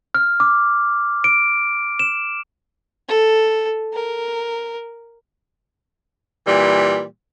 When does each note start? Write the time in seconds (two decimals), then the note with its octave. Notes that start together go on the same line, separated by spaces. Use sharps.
0.14 F6
0.40 D6
1.24 D7
1.99 E7
3.09 A4
3.94 A#4
6.47 A#2 E3 G3